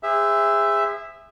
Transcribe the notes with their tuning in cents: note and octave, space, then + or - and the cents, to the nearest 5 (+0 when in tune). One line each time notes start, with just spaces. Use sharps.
G#4 -30 C5 -35 E5 +5